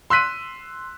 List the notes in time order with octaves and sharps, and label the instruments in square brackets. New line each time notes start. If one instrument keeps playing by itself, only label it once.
[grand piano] C6 E6 F#6 B6 D#7